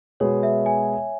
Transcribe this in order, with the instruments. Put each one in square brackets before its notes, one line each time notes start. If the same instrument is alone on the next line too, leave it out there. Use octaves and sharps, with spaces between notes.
[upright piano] B2 G#3 B3 G#4 [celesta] C#5
[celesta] E5
G#5